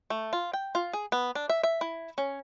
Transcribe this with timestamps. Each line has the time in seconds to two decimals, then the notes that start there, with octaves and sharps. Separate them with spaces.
0.10 A3
0.33 F4
0.53 G5
0.75 F4
0.93 G#4
1.12 B3
1.35 D4
1.50 E5
1.63 E5
1.81 E4
2.18 C#4